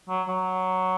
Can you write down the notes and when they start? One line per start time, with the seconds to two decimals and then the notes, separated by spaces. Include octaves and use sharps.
0.09 F#3
0.29 F#3